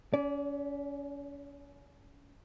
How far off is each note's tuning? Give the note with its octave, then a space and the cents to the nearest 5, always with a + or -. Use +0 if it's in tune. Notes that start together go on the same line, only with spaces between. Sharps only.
C#4 +30 D5 -25